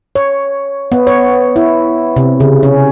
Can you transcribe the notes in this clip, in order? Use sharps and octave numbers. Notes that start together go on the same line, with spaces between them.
C#5
B3
C#5
E4
C3
C#3
C#4